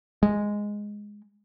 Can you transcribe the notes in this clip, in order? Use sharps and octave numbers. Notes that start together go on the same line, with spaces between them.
G#3